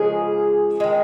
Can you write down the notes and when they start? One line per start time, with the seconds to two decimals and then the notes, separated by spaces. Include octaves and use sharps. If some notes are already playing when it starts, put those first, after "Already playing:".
Already playing: C#3 F3 G#3 G#4
0.80 D#3 G#3